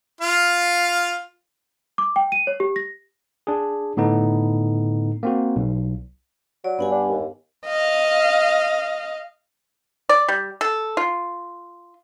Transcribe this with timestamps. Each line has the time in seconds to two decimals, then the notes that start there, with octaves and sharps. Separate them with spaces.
0.21 F4 F5
1.98 D6
2.16 G5
2.32 D#7
2.47 C#5
2.60 G4
2.76 A#6
3.47 D4 G#4
3.97 A2 D3 B3 D#4
5.23 A#3 C4 F#4
5.56 B1
6.64 F#3 D5
6.79 G2 B3 F#5 G#5
6.92 D4
7.09 D#2
7.66 D#5 F5
10.09 D5
10.28 G3
10.61 A4
10.97 F4